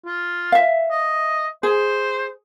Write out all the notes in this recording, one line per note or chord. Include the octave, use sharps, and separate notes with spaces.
F4
E5 F5
D#5
G#4 C5